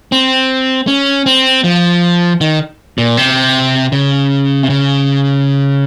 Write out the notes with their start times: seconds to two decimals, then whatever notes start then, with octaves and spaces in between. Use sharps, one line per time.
0.12 C4
0.87 C#4
1.26 C4
1.64 F3
2.41 D#3
2.98 A#2
3.17 C3
3.92 C#3
4.63 C3
4.69 C#3